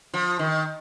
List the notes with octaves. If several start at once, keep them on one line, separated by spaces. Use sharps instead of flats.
F3
D#3